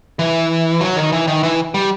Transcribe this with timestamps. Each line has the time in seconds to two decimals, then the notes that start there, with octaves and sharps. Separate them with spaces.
0.19 E3
0.81 F#3
0.96 D#3
1.12 E3
1.27 D#3
1.43 E3
1.74 G3